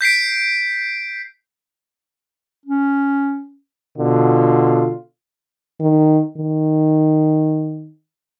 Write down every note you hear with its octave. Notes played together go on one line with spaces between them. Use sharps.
G6 B6 C7 D7
C#4
B2 D3 F4
D#3
D#3